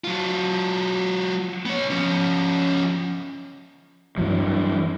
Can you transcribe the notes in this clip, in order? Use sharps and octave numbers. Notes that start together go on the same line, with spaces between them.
F#3 F4
B3 C#5
F3 C#4
G2 E3 F#3